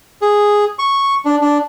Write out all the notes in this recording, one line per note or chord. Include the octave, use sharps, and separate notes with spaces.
G#4
C#6
D4
D4